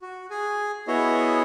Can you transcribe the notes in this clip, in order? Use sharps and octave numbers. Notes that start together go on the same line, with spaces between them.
F#4
G#4 G#5
B3 E4 F#4 G#4 C#5 D#5